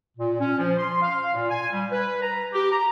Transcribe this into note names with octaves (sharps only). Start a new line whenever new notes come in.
A#2
C#4
F3
C6
F5
A#2
G#5
G3
B4
A#5
G4
A#5